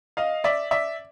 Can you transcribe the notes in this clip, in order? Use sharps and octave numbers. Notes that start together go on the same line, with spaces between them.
D#5 F5
D5 E5
D5 E5